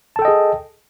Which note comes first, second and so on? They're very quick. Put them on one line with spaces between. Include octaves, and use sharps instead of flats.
A5 A4 G5 D#5 G#4